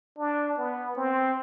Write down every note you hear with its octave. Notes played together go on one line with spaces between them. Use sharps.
D4
B3
C4